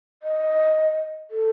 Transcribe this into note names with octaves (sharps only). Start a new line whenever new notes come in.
D#5
A4